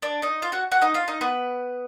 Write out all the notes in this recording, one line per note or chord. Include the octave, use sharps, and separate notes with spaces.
D4 D5
D#4 D#5
F4 F5
F#4 F#5
F#4 F#5
D#4 D#5
F4 F5
D#4 D#5
B3 B4